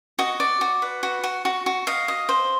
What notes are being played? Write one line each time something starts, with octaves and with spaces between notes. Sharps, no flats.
F#4 D#5
D5
F#4
B4
F#4
F#4
F#4
F#4
D#5 F5
D#5
C5